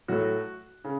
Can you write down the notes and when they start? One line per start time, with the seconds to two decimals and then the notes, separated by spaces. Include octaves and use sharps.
0.08 A2 F#3 A3 F#4
0.84 C#3